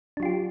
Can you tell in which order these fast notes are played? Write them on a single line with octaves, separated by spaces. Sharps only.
D4 F#3 F4 G4